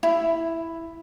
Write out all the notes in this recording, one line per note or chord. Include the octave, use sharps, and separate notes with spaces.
E4